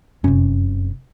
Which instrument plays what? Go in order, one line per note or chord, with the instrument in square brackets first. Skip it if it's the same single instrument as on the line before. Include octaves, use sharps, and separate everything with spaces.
[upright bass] F1 C3 [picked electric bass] F#2 C#4